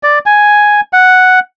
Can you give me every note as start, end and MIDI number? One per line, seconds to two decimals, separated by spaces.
0.03 0.19 74
0.26 0.81 80
0.93 1.40 78